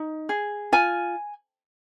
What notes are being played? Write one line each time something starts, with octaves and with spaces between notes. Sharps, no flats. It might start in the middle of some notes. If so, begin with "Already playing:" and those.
Already playing: D#4
G#4
F4 G#5